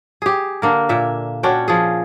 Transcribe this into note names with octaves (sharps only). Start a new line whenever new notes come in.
G4 G#4
D3 A#3 A#4
A#2 E5
C#4 D4 F#4 G5
F3 G#4